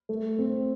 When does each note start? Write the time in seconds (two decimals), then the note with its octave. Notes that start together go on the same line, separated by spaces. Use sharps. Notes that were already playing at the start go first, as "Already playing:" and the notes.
0.09 A3
0.39 C4